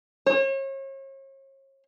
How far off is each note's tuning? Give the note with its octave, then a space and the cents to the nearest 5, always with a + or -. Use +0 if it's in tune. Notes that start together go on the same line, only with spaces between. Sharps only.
C#5 -40